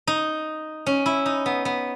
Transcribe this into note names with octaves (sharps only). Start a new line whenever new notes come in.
D#4
C#4
E4
D#4
B3
B3